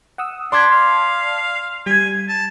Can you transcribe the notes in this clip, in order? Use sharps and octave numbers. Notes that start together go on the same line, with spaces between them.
F#5 D#6 E6
D4 D5 A5 C6 D6 G#6 B6
F5
G3 G#5 G#6 B6
A5